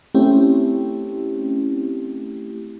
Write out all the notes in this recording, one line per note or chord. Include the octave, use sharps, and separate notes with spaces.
A3 C4 C#4 E4 G4